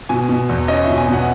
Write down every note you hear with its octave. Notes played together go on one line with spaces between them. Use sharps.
B2 G#5
B2
E2
C#4 D#5
B2 E5
G#5
B2
F#5